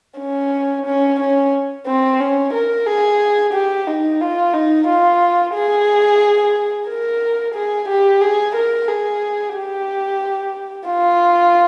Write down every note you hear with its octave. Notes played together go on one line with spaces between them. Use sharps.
C#4
C#4
C#4
C4
C#4
A#4
G#4
G4
D#4
F4
D#4
F4
G#4
A#4
G#4
G4
G#4
A#4
G#4
G4
F4